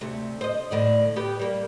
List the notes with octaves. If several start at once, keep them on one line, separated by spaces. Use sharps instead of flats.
D2 C3 A3
C5 D#5
A2 D3 D5
B3 G4
G3 A#3